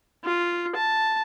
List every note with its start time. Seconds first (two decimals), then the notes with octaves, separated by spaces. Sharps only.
0.25 F4
0.76 A5